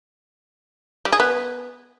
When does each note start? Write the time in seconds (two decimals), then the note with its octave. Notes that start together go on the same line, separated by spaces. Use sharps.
1.05 G3
1.12 G#4
1.20 B3